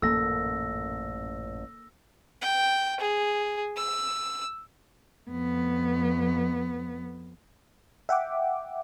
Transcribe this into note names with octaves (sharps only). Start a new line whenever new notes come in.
A1 F#2 A#2 A#3 A4 E6 A#6
G5
G#4
E6
F2 B3
E5 F#5 G5 D6